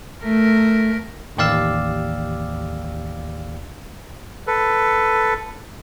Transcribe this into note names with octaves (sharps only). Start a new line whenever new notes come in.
A3 A#4
A1 D#2 G4 D5 F5 E6
A4 B4